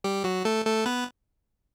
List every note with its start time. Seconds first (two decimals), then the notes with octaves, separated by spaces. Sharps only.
0.04 G3 G4
0.24 F#3 F#4
0.45 A3 A4
0.65 A3 A4
0.86 B3 B4